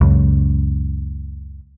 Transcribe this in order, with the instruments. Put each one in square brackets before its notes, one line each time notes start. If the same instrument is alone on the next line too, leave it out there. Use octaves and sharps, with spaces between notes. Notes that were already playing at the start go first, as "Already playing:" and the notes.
[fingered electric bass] C#2 F#2